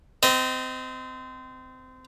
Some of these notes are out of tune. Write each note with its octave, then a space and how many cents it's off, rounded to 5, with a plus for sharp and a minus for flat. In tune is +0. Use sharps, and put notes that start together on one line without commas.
C4 -25 D#5 +5